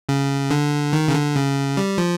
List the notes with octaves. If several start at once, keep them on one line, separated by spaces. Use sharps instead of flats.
C#3
D3
D#3
C#3
D3
C#3
G3
F3